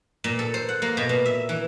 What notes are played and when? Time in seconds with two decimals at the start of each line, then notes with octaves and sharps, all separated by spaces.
0.24 A#2
0.39 A4
0.54 C5
0.69 F#5
0.82 A#3
0.97 B2
1.09 A#2
1.26 E5
1.49 E3